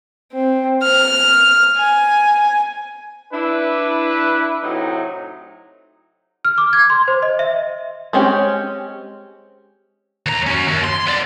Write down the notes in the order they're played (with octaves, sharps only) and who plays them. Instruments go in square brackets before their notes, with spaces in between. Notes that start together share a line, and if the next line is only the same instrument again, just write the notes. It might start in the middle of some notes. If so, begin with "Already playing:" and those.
[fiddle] C4
F6
G#5
[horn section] D4 E4 B4
A2 C3 F#3 D#4
[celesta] F6
D6
G#6
C6
C5
D#5
E5
[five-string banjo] G#3 C4 C#4 G4
[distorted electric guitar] D#2 A#5
C#4 F#4
D#2
C6
B3 D5